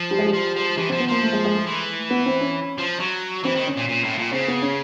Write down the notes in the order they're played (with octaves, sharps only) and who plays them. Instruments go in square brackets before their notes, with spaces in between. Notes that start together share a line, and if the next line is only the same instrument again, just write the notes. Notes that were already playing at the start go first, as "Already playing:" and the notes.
Already playing: [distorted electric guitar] F3
[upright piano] G3
G#3
G3
[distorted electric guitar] F3
F3
[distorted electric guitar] E3 [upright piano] G3
[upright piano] C4
[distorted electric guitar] F3
[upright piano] B3
[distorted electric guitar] F3 [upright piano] A#3
[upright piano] A3
G#3
G#3
A3
[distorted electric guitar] E3
[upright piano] B3
C4
C#4
[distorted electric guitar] F3
F#3
[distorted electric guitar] E3 [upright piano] C4
[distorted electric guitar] D#3
[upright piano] C#4
[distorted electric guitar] A#2
A#2
A2
A#2
[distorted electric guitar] C#3 [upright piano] C4
[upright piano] B3
C#4